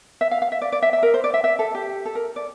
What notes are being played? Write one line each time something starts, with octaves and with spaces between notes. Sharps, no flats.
E5
F5
F5
E5
D5
D5
E5
E5
A#4
C5
D5
E5
E5
A4
G4
A4
A#4
D5